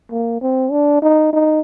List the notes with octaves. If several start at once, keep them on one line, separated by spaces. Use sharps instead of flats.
A#3
C4
D4
D#4
D#4